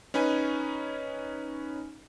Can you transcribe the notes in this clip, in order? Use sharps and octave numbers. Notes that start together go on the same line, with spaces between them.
C#4 D#4 B4 G#5